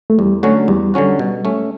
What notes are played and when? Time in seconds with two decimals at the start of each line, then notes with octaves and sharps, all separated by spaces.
0.10 A3
0.19 E2 G3
0.43 D3 F#3 A3 C#4 F#4
0.68 E2 G3
0.94 D3 F#3 C#4 F#4
1.19 B2
1.45 A3 C#4